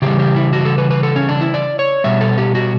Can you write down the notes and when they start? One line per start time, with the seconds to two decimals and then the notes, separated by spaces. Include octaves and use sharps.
0.02 C#3 E3 G3 G4
0.19 G4
0.36 E4
0.53 F#4
0.65 A4
0.78 B4
0.91 B4
1.03 A4
1.16 C#4
1.29 D4
1.41 E4
1.54 D5
1.79 C#5
2.04 B2 G3 E5
2.21 A4
2.38 G4
2.55 F#4